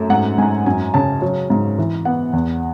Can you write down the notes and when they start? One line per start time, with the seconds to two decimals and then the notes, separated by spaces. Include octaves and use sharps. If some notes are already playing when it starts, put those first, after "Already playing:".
Already playing: F#2 A3
0.10 G#2 F#5
0.38 G#2 G#5
0.66 F#2 G#5
0.94 C#3 A5
1.22 F#3
1.50 G#2
1.78 E3
2.05 B3 F#5
2.33 E2